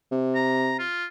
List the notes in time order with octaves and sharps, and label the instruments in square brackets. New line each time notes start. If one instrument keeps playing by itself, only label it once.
[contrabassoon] C3
[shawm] A#5
F4